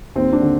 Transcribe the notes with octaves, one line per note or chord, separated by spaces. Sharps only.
D#2 C4
D4
D3